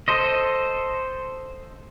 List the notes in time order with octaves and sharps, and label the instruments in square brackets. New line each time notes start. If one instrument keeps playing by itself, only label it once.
[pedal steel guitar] A4 C5 D#5